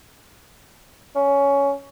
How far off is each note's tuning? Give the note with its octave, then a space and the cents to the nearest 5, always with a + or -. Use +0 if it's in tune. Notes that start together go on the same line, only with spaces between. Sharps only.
C#4 +15